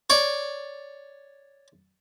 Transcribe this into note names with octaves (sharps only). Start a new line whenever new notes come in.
C#5 D5